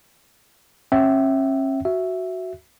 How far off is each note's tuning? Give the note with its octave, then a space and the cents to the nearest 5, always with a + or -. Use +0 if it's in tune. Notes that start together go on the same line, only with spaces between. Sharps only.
C#4 -35 E5 +0 G5 -45
F#4 +0 E5 +0